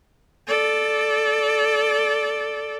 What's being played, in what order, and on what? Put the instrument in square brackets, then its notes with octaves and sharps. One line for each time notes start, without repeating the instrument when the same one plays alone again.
[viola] A4 D5